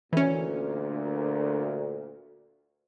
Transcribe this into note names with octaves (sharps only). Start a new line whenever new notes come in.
D2 A#2 E3 C#4